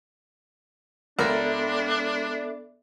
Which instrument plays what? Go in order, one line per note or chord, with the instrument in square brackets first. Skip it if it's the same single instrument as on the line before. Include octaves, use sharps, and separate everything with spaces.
[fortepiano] C#2 A#4 [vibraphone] B3 A4 E5 [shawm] D4 [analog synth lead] D5